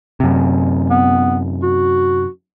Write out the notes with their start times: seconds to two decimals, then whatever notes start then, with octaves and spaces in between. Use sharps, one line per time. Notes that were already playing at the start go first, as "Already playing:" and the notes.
0.20 F#2 C3
0.90 B3
1.63 F#4